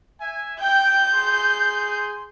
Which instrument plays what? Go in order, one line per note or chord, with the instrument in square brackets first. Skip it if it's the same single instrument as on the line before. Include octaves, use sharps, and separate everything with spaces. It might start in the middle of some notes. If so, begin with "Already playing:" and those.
[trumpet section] E5 G#5
[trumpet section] G5 [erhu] G6
[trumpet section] G#4 C6